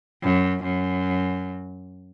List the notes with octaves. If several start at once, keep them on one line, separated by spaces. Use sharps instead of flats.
F#2
F#2